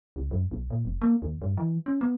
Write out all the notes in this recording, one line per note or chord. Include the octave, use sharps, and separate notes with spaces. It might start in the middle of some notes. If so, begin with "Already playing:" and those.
C#2
F#2
B1
A#2
F1
A#3
D#2
G2
E3
C#4
B3